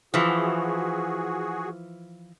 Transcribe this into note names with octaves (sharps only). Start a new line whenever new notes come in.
E3 F3 F#4 G#4